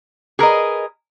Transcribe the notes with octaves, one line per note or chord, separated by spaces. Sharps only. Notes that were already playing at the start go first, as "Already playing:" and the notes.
G#4 A#4 B4 D#5